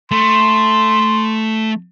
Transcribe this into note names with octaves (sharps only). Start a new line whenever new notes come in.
A3 C6